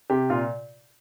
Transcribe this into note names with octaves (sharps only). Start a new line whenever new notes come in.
C3 G4
A#2 F4